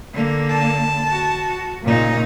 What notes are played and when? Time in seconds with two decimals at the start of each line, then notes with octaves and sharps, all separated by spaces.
0.14 D3 A#3
0.49 A5
1.10 F#4
1.85 A#2 C#3 D#4